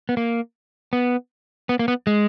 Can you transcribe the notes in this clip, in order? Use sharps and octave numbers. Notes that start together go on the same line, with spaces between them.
B3
A#3
B3
B3
A#3
B3
G#3